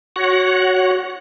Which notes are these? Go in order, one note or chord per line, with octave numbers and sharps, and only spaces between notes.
F#4 C#5 F#5